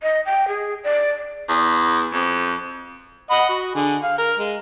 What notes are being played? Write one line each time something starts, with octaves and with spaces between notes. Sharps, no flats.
D#5
G5
G#4
D5
E2
F2
D#5 F#5 B5
F#4
D3 G#4
F5
A#4
G#3